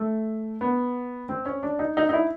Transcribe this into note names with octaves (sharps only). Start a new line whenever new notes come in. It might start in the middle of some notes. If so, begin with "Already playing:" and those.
Already playing: A3
B3
C4
C#4
D4
D#4
D#4
D#4
E4